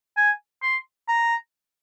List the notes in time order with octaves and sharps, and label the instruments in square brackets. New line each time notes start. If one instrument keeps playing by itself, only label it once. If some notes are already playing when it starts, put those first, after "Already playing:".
[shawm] G#5
C6
A#5